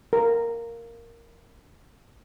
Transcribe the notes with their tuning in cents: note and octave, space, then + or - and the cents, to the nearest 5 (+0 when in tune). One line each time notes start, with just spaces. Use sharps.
A#4 -5